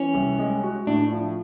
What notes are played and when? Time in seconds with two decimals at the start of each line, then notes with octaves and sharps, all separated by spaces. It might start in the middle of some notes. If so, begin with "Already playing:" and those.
Already playing: E3 C#4
0.14 C2
0.39 G#3
0.63 F#4
0.87 A2 D4
1.12 F3